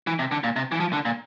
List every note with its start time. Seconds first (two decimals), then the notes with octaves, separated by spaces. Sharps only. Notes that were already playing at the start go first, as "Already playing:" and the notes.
0.07 E3
0.19 C3
0.31 D3
0.44 A#2
0.56 C3
0.72 E3
0.80 F3
0.93 D3
1.05 A#2